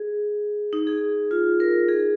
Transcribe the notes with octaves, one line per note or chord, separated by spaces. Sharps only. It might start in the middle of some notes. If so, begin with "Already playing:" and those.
Already playing: G#4
D#4
G#4
F4
A#4
G#4